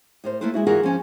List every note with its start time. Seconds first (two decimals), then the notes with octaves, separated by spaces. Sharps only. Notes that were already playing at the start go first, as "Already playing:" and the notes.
0.24 A2 A#4 C5
0.41 A3 A#3 E4 B4 C5
0.54 G#3 E4 F#4
0.66 E3 F4 F#4 G#4 A#4
0.83 F3 C#4 G#5